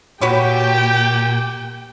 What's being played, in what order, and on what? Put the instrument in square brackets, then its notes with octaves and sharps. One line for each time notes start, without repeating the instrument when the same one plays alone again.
[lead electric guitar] A#2 [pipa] F#4 B4 C#5 [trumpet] G4 [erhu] G5